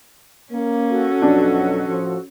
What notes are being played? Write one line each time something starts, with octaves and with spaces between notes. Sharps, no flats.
A#3 C#4
F#4 A4
F2 B2 F#3 D4
A2 F3